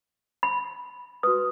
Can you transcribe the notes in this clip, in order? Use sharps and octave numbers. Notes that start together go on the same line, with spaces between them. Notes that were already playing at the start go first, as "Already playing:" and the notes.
B5
F#4 B4 D#6